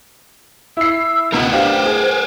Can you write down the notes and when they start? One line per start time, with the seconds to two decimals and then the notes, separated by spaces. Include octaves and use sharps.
0.77 E4 E6 C7
1.32 C#2 B2 A#4 B4 F#5
1.52 D4 G4 C5 F5
1.85 G#4